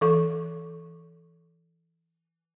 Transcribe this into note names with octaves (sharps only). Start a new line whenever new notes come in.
E3 A4 C#6